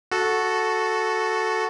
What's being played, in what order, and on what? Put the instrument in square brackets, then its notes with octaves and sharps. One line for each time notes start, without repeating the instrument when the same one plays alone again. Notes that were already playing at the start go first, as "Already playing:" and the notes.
[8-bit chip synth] F#4 A4